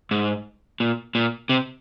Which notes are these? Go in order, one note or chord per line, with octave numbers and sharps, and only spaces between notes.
G#2
A#2
A#2
C3